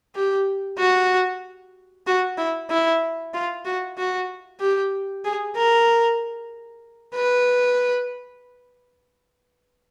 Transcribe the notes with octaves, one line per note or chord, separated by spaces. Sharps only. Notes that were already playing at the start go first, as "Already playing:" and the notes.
G4
F#4
F#4
E4
E4
F4
F#4
F#4
G4
G#4
A#4
B4